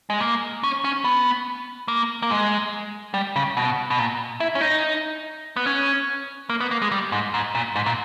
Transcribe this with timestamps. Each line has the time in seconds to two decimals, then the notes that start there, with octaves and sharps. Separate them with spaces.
0.10 G#3
0.20 A#3
0.63 C#4
0.84 C#4
1.04 B3
1.88 A#3
2.22 A#3
2.30 G#3
3.14 G3
3.36 C#3
3.57 B2
3.90 B2
3.99 A#2
4.40 E4
4.55 C#4
4.61 D#4
5.56 B3
5.66 C#4
6.50 A#3
6.60 B3
6.71 A#3
6.82 G#3
6.92 G3
7.12 G#2
7.34 G#2
7.55 A#2
7.76 G#2
7.86 A#2